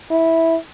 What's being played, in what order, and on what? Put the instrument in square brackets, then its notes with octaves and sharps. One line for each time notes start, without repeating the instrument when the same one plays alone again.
[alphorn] E4